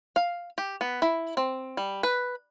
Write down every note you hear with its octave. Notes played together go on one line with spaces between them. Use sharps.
F5
G4
B3
E4
C4
G3
B4